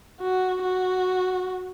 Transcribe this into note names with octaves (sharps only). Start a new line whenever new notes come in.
F#4
F#4